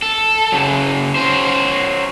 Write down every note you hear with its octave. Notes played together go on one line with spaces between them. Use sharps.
A4
C#3 F#3
F#3 C#4 C5